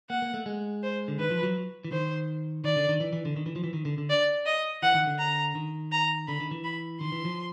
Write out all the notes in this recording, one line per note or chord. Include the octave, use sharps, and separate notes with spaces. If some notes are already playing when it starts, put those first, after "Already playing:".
A#3 F#5
A#3
A3
G#3
C5
D3
D#3 B4
F3
F#3
E3
D#3 C5
D#3 D5
D3
D#3
E3
E3
D3
D#3
E3
F3
E3
D#3
D3
D3
D5
D#5
E3 F#5
D#3
D3
A#5
D#3
A#5
D3 B5
D#3
E3
B5
D#3 C6
E3
F3